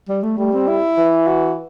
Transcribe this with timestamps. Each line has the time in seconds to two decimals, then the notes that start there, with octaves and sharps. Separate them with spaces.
0.09 G3
0.23 A3
0.38 G3 A3
0.53 C4
0.67 E4
0.98 E3
1.27 F#4